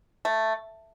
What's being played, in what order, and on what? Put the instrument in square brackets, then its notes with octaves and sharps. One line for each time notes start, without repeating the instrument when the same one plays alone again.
[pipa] A3